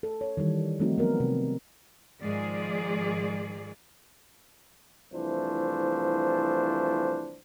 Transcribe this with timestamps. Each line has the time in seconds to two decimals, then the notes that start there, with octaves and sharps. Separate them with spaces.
0.03 A4
0.21 C#5
0.37 D#3 E3 G3
0.79 F3 G3 A3 C4 D#4 F#4
0.98 F#3 B3 A#4
1.20 C3
2.22 G#2 D#3 F3 G#3 G#4 D5
5.13 C2 E3 F3 A3 D4 C5